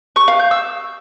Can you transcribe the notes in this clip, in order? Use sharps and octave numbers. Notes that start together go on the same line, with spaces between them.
C#6
F5
G6
E6